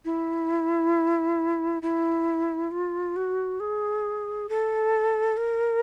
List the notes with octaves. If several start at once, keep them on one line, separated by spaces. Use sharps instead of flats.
E4
E4
F4
F#4
G#4
A4
A#4